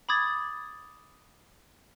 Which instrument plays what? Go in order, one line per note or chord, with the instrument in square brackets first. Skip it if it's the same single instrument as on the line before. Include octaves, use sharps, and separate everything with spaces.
[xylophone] B5 D6 D#6 G#6 A6